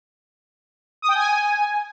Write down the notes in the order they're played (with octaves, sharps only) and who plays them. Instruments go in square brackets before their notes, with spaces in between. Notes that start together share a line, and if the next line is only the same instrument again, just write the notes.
[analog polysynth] D#6
G5
G#5